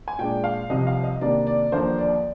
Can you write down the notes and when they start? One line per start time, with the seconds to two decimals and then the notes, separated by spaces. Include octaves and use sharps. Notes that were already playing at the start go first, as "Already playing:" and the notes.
0.08 G#5
0.18 A#2 G#3 D4 G5
0.44 F5
0.70 C2 C3 F3 D#5
0.87 F5
1.04 D#5
1.21 C3 D#3 A#3 D4 D5
1.47 D5
1.72 D#2 D3 F3 A#3 D4 C5
1.99 D5